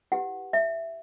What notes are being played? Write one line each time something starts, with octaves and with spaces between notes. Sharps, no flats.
E4 G4 B4 F#5
E5